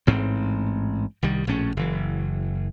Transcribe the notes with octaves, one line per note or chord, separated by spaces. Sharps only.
A1 G#2 C4
C2 D#3 G3
A#1 A2 A3 C#4
F#1 E3